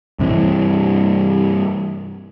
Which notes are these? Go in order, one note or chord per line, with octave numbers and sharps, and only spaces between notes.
G2 C3 E3